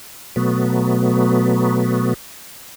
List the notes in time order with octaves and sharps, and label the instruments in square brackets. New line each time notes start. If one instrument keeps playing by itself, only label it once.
[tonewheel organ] B2 F#3 A3 B3